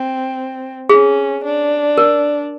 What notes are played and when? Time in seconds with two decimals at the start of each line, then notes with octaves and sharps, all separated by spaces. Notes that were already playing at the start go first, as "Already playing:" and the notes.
Already playing: C4
0.89 C#4 G#4
1.44 D4
1.98 A#4